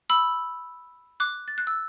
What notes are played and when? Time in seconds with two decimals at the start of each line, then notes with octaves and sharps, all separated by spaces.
0.10 B5 E6
1.20 D6 F#6
1.48 A6
1.58 F#6
1.67 E6